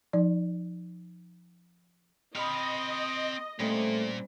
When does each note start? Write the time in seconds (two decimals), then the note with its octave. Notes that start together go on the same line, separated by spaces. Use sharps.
0.13 F3 D#4 D5
2.35 C4 D#5 A#5 B5 F6
3.60 A#2 G3 A3 C4 C#4